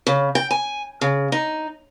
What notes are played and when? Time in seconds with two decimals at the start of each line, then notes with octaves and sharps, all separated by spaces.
0.07 C#3
0.35 G5
0.51 G#5
1.01 C#3
1.32 D#4